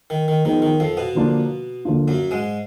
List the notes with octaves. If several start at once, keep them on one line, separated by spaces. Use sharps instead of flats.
D#3
D#3
D#3 F3 B3 D#4 G#4
D#3
F2 F3
B2 B3
D3 F3 A#3 D4 F4
D3 F3 A#3 D4 F4
F#2 F#3
G#2 G#3